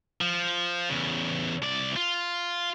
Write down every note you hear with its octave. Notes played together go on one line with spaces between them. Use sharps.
F3
E2 C#3
C2 D5
F4